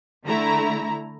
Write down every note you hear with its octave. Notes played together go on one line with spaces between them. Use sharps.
D3 A3 E4 A#5